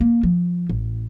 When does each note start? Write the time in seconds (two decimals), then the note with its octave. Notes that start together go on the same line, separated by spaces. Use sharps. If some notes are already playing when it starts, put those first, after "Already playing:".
0.01 A#3
0.23 F3
0.69 A1